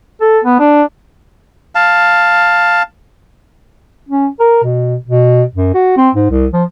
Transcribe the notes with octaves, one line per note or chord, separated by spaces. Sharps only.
A4
B3
D4
F5 A5
C#4
A#4
B2
B2
F#2
F#4
C4
G#2
C2
F3